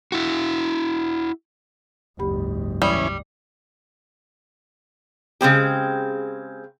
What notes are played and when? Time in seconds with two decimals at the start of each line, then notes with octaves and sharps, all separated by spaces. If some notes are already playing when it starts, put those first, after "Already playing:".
0.12 E4 F#4
2.19 F#1 D2 G#2 G4 B5
2.82 E3 G3 C#4 B5 D#6
5.41 C#3 G#3 C4 G4